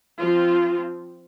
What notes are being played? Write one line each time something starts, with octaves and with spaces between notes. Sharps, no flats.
F3 C4 F4